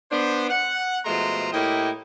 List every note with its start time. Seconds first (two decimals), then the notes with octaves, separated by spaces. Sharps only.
0.11 B3 D4 C5
0.49 F#5
1.05 B2 F3 G#3 A3 A#5 C6
1.53 A2 A#3 E4 G4 D#5 G5